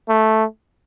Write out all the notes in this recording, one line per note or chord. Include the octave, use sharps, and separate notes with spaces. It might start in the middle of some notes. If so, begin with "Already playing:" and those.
A3